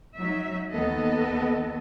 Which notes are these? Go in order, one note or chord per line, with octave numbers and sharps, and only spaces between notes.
F#3 D#4 E5
D#2 D#3 B3 A4 D#5